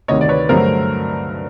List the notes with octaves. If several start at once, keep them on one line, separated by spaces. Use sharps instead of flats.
D2 C3 D#3 C#5 D#5
D5
B4 C#5
G2 D3 F#3 A3 A#4 C5